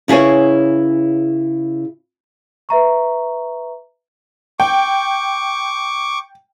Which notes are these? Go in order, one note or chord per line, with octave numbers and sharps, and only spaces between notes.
C#3 E4 G#4 B4 C#5
B4 E5 A#5 C#6
G5 C#6 D6